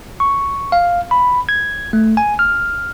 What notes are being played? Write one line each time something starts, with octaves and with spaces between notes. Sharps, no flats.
C#6
F5
B5
G#6
A3
G#5
F6